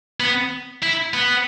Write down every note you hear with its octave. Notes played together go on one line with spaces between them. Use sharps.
B3
E4
B3